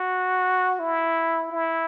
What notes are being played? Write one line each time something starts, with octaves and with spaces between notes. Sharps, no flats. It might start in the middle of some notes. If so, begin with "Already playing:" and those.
Already playing: F#4
E4
E4